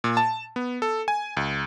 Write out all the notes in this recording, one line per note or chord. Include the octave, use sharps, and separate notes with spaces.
A#2
A5
B3
A4
G#5
C#2